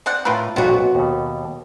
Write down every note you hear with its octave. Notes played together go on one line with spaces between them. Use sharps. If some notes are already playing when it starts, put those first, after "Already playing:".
C4 D5 F#5
A2 A3 F4 A#4 B4
B1 F2 A#2 B3 C4 F#4
D#2 B2